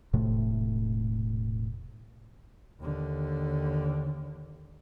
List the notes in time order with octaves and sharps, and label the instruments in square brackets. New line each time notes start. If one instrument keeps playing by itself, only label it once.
[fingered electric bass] E1 A2 C3 A3
[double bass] D#2 D3